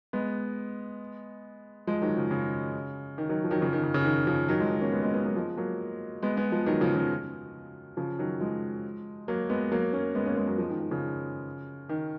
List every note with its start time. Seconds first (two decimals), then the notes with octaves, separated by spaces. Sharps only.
0.13 G#3 B3
1.87 F3 G#3
2.02 D#3 F#3
2.16 C#3 F3
2.31 C#3
3.18 D#3
3.29 D#3 F#3
3.44 F3
3.51 D#3 F#3
3.62 C#3 F3
3.73 D#3
3.83 C#3
3.94 C#3
4.05 D#3
4.27 C#3 F3
4.48 D#3 F#3
4.60 F3 G#3
4.71 D#3
4.81 A#3 C#4
4.92 G#3 B3
5.03 G#3 B3
5.14 G#3 B3
5.25 F#3 A#3
5.36 F3 G#3
5.57 F#3 A#3
6.23 G#3 B3
6.37 G#3 B3
6.52 F3 G#3
6.66 D#3 F#3
6.81 C#3 F3
6.95 C#3 F3
7.97 C#3 F3
8.19 D#3 F#3
8.41 F3 G#3
9.28 F#3 A#3
9.50 G#3 B3
9.72 F#3 A#3
9.93 A#3 C#4
10.15 G#3 B3
10.26 A#3 C#4
10.36 G#3 B3
10.47 F#3 A#3
10.58 F3 G#3
10.70 D#3
10.80 D#3
10.91 C#3 F3
11.89 D#3